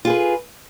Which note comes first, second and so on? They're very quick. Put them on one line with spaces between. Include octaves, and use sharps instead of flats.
F4 G#4 B4